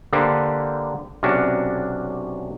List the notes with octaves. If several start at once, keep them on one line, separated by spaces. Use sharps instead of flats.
D3 A#3 G4 A4 B4 C5
B1 C3 C#4 D4 F#4